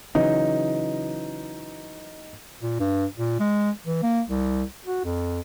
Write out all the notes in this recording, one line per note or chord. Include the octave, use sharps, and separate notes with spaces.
C#3 E3 F#3 D#4
A#2
G2
A#2
G#3
E3
A#3
C2
F#4
F2